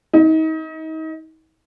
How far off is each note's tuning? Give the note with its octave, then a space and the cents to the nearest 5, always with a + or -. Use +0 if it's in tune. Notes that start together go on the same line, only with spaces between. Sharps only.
D#4 +35